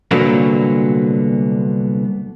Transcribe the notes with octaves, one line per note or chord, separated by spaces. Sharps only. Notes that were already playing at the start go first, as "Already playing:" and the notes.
C2 A#2 D3 F#3 A#3 B3